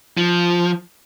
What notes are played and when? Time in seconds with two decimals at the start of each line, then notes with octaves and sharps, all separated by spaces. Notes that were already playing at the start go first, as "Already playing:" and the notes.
0.17 F3